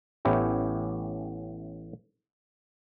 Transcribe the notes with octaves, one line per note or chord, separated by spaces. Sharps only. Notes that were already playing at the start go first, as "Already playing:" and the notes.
A1 A2 B3 C#4 E4 G4